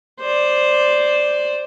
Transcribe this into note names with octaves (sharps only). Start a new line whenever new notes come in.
C5 D5